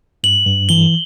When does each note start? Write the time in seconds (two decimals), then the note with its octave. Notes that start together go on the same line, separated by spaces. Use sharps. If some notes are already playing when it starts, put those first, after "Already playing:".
0.24 G2 F#7
0.46 G2
0.69 E3 G7